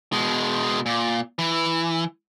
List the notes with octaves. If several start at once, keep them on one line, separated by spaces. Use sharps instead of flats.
B2 G#3
A#2
E3